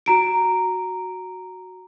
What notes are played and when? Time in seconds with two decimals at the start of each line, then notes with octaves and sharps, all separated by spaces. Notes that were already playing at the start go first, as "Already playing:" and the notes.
0.06 F#4 A#5 D7